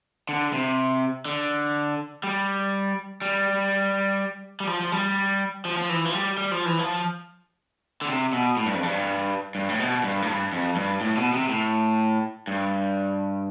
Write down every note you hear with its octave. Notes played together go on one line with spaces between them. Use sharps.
D3
C3
D3
G3
G3
G3
F3
F3
G3
F3
F3
E3
F3
G3
G3
F3
E3
F3
D3
C3
B2
A2
G2
F2
G2
G2
A2
B2
G2
A2
G2
F2
G2
A2
B2
C3
A2
G2